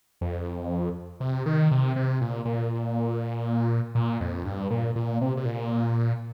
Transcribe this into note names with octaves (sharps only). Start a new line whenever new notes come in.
F2
C3
D#3
C3
C3
A#2
A#2
A#2
F2
G2
A#2
A#2
C3
C3
A#2